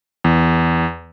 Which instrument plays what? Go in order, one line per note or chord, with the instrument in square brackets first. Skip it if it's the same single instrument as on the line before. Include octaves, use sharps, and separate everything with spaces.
[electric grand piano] E2